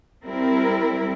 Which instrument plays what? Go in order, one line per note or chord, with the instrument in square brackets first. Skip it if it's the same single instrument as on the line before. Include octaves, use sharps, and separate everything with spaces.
[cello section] G3 C4 E4 A#4